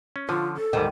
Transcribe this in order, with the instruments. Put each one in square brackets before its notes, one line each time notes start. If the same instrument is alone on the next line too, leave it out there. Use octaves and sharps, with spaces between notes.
[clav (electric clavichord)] C#4
[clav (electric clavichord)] D3 F3 [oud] C#4 [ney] F4
[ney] A4
[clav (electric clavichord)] D2 G#2 G3 [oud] D#3